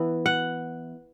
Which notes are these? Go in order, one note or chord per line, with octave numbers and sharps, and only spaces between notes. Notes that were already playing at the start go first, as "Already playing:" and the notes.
Already playing: E3 B3 E4
F#5